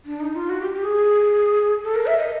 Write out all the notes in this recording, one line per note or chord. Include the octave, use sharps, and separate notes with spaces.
D4
D#4
F4
F#4
G4
G4
G#4
A4
A#4
E5
D#5